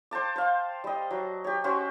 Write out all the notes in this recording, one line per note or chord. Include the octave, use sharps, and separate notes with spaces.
C5 G5 A5 D6
C5 F5
G3 D#5
F#3
G4 C#5
C#4 F#4 G4 C5